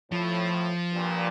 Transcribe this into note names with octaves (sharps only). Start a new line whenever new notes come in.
A2 F3
G2 A#2